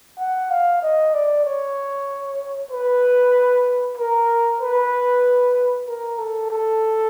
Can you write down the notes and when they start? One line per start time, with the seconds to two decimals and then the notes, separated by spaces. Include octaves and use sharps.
0.19 F#5
0.50 F5
0.82 D#5
1.14 D5
1.45 C#5
2.71 B4
3.98 A#4
4.61 B4
5.88 A#4
6.19 A4
6.50 A4